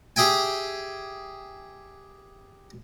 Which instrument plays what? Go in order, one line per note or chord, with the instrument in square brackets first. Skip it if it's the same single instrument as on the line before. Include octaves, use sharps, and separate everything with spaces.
[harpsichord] G4 G#4 E5 G5 G#5